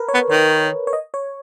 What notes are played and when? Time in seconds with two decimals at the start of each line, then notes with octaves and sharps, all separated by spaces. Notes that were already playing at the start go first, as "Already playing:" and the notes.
Already playing: A#4 B4
0.08 C#5
0.14 B3
0.29 D#3 C#5
0.87 C#5
0.93 D#5
1.14 C#5